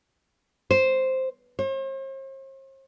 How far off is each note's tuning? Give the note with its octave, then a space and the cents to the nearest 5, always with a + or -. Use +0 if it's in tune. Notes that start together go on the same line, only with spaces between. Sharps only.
C5 +0
C5 +45